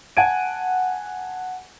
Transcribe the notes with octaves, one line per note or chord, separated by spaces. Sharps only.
F#5 G#5 A5 G#6 D7 D#7